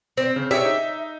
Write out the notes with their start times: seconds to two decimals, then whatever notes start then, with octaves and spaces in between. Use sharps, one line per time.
0.17 C4
0.36 C#3
0.51 G4 G#4 C#5 E5
0.65 D#4